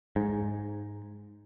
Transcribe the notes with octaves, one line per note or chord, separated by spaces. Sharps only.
G#2